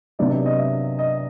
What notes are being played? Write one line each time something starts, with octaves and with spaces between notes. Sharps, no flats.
C3 D#3 F#3 B3 D4 D5
D5
D#5
E5
D#5